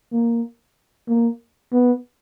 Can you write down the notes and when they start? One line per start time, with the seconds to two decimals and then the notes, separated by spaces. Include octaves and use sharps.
0.13 A#3
1.08 A#3
1.73 B3